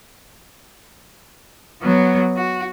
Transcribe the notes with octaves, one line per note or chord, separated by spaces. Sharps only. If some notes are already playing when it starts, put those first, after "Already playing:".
F#3 B3
F#4